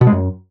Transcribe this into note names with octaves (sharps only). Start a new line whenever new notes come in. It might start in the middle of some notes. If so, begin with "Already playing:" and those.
B2
G#3
F#2